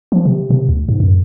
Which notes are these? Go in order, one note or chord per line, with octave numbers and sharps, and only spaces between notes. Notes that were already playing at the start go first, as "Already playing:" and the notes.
F3
C3
C3
D2
G#2
F#2